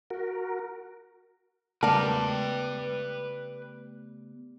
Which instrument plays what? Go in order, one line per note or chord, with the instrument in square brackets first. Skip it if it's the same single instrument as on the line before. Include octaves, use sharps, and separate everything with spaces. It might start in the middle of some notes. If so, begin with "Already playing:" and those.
[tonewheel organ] F#4 A#4
[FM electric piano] C#3 A3 B3 [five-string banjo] G3 A#4 [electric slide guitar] B4 G5 [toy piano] A5